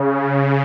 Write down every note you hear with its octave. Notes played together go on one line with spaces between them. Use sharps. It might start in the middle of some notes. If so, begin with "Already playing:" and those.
Already playing: C#3